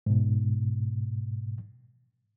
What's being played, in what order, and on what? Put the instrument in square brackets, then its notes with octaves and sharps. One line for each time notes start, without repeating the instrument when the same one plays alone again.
[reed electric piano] G#2 B2